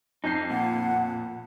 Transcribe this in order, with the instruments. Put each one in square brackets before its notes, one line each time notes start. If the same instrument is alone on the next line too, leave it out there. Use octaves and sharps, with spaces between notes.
[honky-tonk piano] F2 G6 C7 [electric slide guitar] D#4
[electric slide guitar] A#2 [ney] F#5